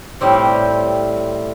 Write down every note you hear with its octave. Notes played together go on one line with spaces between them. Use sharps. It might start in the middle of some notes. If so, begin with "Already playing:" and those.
A2 G3 C4 G4